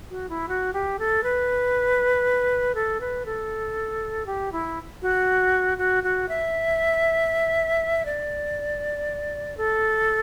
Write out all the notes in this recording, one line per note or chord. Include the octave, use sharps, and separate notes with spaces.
F#4
E4
F#4
G4
A4
B4
A4
B4
A4
G4
E4
F#4
F#4
F#4
E5
D5
A4